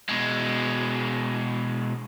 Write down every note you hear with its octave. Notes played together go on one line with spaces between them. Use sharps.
B2 G#3